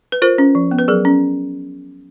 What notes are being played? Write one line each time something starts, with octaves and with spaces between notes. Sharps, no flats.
B4
F4 A#4 C5
C#4
F3
B3
B4
F#3 G#4 A#4
C#4